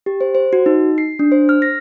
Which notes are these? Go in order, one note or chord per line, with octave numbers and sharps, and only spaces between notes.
G4
C5
C5
F#4
D#4
C7
D4
C5
F6
A#6